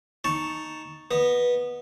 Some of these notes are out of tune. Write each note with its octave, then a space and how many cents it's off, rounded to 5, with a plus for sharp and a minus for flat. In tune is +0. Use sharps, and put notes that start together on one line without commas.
D#4 +0 A5 +0 C#6 +0
B3 -15 D#5 +0